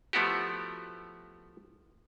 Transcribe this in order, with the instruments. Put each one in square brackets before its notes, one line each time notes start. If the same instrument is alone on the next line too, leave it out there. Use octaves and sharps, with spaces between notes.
[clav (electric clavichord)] F3 A3 B3 E4 F#4 G4